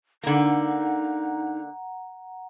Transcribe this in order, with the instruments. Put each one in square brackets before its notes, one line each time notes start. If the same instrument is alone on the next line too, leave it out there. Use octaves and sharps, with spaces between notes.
[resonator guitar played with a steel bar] D3 A#3 [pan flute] D#4 [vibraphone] F#5 A#5